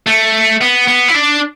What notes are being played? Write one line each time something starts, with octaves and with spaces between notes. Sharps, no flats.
A3
B3
B3
E4
D4